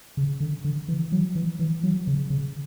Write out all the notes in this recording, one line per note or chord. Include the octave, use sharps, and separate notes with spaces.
C#3
D3
D3
E3
F#3
E3
E3
F#3
C#3
C#3